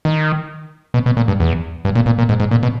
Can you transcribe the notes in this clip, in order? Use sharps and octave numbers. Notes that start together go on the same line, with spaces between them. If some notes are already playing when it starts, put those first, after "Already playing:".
D#3
B2
B2
A#2
G2
E2
G2
A#2
A#2
A#2
G#2
G#2
A#2
B2